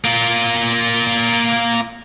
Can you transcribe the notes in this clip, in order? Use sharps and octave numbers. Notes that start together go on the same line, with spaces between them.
A#3 F4